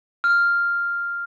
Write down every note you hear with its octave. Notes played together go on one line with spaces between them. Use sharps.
F6